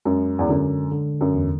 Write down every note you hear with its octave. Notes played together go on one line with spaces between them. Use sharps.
F#2 G#3
E2
F#2 D3
D3
F#2
E2